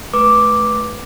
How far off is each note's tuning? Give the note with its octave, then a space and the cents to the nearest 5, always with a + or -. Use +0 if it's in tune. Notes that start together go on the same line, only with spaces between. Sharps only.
A3 -30 B4 -10 D6 +0